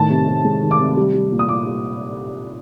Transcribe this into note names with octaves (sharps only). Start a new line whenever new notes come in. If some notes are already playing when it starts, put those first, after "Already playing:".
Already playing: A2 D#3 A5
C3
C3
G#3
D#3
D6
C3
G3
G3
A#2
D#6
A#2 D6
G3